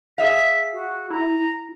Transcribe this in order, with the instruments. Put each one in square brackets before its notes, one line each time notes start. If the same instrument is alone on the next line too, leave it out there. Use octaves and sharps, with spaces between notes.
[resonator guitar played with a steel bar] G#4 E5 F5 [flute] B6
[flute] F#4
[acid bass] E4 [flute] A#5